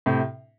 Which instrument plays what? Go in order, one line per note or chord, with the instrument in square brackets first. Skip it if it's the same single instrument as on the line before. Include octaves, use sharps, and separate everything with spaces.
[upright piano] A2 C3